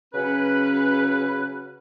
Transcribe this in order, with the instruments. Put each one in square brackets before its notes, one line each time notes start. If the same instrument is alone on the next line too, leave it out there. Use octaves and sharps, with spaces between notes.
[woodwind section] C#3 F#3 C#4 B4